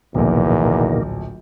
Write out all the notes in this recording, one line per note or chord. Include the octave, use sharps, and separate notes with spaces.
D1 A#1 E2 B2 D#3 A#3